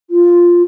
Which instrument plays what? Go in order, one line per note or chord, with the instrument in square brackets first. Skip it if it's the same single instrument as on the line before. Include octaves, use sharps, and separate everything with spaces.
[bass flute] F4